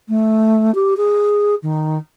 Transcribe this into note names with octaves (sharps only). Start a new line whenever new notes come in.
A3
G4
G#4
D#3